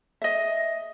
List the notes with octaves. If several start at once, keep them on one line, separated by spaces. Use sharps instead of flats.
D#5 E5